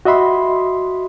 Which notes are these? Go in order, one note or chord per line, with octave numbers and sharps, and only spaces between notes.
F#4 D#5 E5 B5 C6